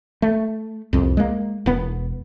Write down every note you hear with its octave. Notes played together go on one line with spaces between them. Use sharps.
A3
C2 F2
G#3 A#3
E1 B3